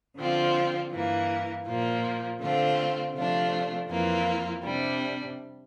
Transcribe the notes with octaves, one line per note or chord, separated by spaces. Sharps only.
D3 F3 C4 F4
G2 E3 A#3
A#2 F3 A#3 F4
D3 A3 C4 F4
C3 F3 A3 D4 F4
F2 E3 A#3 F4
C3 G3 D4